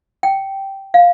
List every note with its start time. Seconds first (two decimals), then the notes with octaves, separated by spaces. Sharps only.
0.23 G5
0.94 F5